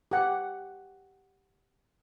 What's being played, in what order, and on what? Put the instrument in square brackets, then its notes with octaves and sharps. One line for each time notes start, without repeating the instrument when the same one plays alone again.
[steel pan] G4 F#5